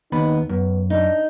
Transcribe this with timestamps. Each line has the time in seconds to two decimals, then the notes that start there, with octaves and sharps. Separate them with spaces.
0.12 D#2 B3 D#4 B5
0.49 F#2 B3
0.90 D4 D#4